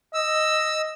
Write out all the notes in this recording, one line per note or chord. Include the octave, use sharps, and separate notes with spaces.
D#5 E6